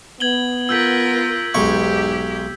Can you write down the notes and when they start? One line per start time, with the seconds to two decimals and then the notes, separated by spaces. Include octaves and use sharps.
0.20 B3 G#6 F#7 G7
0.69 F4 A#4 E6 G6 B6
1.54 B1 E2 G#2 G#3 G4 C#6